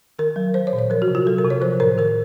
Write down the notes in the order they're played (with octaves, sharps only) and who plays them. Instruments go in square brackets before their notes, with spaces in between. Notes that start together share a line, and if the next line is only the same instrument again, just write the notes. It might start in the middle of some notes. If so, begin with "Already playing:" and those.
[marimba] D#3 A#4
F#3
F#3 C5
C#5
A#2
C#5
F3 A#4
F#4
C3
F4
F#3 A4
A#4
C3
C#5
F3 C5
A2 A#4
D#3 A#4